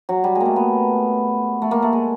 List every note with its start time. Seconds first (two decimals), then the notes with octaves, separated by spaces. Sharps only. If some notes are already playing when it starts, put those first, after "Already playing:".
0.09 F#3
0.24 G3
0.35 G#3
0.40 A3 A#3
0.56 B3
1.62 A3
1.71 A#3
1.82 A3
1.93 G#3